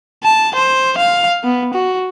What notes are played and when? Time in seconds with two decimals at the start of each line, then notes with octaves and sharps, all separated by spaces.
0.24 A5
0.55 C5
0.98 F5
1.44 B3
1.74 F#4